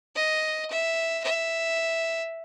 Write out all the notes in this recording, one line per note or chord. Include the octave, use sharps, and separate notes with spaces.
D#5
E5
E5